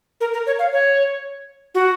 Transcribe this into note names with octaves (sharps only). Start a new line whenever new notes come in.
A#4
A#4
C#5
F5
C#5
F#4